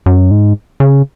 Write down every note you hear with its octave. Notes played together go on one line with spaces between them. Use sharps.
F#2
G#2
C#3